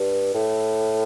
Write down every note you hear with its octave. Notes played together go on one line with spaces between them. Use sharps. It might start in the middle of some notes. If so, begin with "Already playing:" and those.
Already playing: G2
A2